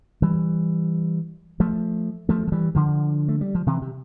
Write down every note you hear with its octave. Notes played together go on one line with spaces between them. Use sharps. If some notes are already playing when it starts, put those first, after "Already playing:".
E3 G3
F3 A3
F3 A3
F3
E3 G3
D3 F3
A3
G3
F3
C3 E3
C3